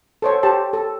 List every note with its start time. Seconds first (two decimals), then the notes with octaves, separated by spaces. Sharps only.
0.22 A4 C5 C#5
0.43 G4 C5 A5
0.73 A4